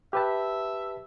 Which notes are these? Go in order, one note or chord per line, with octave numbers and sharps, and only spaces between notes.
G4 B4 E5 A5